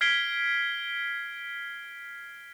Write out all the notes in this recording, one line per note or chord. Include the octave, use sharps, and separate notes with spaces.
F6 G#6 B6 C7 D7 G7